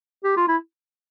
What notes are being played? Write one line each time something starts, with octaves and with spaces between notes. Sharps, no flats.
G4
F4
E4